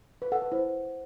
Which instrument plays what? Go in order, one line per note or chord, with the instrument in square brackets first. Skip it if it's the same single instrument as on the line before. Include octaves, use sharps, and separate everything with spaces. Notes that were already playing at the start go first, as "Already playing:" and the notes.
[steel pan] B4
[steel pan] A4 [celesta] F#5
[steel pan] B4
[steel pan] E4 [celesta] C5